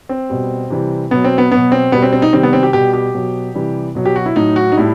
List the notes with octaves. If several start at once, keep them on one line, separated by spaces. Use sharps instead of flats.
C4
B2 G3
C3 E3 G3
B2 F#3 B3
C4
B3
B2 F#3 B3
C4
B2 G3 B3
C4
C4
D#4
C3 D#3 G3 C4
B3
C4
G4
B2 G3 G4
G4
B2 F#3
C3 E3 G3
B2 F#3
G4
F#4
E4
A2 F#3 D#4
F#4
D#4
A2 G3 E4